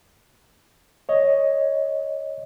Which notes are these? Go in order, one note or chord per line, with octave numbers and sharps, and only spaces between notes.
C#5 D#5